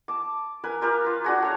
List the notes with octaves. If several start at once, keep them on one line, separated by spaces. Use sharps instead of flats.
A5 D6
A#4 B4 G#5
F4 G4 A#4 B4
F4 B4
D4 F#4 G#4
A3 C#5 A#5